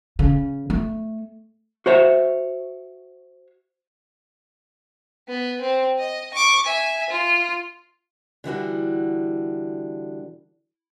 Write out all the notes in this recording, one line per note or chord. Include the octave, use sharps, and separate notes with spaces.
C#3
A3
F#4 C5 C#5 E5
B3
C4
D#5
C#6 D6
E5 G#5
F4
D3 E3 G3 F#4